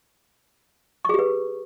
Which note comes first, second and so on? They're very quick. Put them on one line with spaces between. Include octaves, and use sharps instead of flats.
C#6 G#4 G4 B4